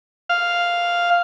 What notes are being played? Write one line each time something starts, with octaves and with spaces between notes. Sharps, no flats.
F5